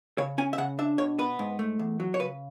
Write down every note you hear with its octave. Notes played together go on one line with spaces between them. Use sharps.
C#3 C#5
C#4 G#5
E5
C#3 F#5
D4 E5
B2 C#5
B3 B4
G#2
A3
E2
F#3
C#5
C#3 B4